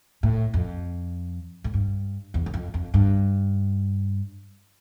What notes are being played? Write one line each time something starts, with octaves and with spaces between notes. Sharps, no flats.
A2
F2
A2
G2
E2
E2
F2
F2
G2